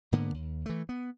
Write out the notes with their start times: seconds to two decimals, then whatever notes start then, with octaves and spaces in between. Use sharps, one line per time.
0.12 G#2 D3 A#3 B3
0.34 D#2
0.66 E3 A3
0.89 B3